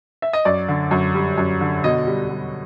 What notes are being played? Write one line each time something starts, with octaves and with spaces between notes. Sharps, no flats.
E5
D#5
F#2 D5
D3
F#2
G3
F#2
D3
B2 D#5
G3
G3